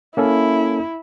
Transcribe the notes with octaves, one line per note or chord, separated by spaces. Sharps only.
A#3 C#4 E4 A4